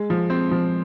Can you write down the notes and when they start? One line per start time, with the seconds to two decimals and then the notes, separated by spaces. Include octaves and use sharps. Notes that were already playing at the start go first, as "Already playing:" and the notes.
Already playing: G#3
0.10 F3
0.30 C4
0.51 F3